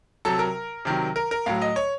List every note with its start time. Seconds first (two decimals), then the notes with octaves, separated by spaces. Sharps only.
0.25 C3 F#3 A4
0.39 A#4
0.85 C3 D#3 F#3
1.16 A#4
1.31 A#4
1.46 A2 F#3 F5
1.62 D#5
1.76 C#5